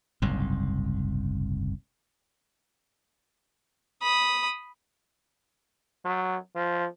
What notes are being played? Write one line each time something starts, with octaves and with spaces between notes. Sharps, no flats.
F#1 C2 G#2
B5 D#6
F#3
F3